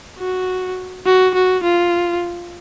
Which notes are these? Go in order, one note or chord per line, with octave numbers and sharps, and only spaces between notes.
F#4
F#4
F#4
F4